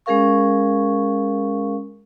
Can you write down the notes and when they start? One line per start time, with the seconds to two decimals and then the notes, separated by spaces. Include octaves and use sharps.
0.06 G#3 C#4 G#4 A#4 F5 C#6